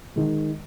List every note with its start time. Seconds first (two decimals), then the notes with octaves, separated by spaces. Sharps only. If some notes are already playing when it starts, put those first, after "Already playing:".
0.16 D#3 G#3